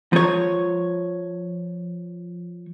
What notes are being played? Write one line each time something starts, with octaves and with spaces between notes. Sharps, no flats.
F3 C#5